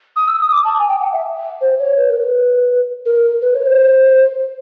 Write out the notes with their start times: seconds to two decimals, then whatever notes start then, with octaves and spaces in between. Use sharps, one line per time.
0.16 D#6
0.28 E6
0.40 D#6
0.52 D6
0.65 A5
0.79 G#5
0.88 G5
1.01 F#5
1.13 E5
1.61 C5
1.79 C#5
1.97 B4
2.09 A#4
2.21 B4
3.06 A#4
3.42 B4
3.54 C#5
3.66 C5